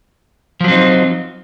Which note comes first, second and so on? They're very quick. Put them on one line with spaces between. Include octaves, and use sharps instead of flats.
F3 F#3 C4 D#4